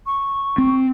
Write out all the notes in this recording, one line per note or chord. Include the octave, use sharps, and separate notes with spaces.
C#6
C4